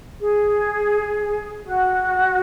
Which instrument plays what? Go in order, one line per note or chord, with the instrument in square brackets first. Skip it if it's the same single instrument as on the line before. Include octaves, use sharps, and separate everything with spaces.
[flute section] G#4
F#4